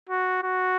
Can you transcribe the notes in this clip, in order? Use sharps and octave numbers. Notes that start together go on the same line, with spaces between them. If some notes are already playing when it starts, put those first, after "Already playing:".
F#4
F#4